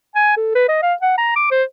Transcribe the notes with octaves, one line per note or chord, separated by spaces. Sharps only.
G#5
A4
B4
D#5
F5
F#5
A#5
D6
C5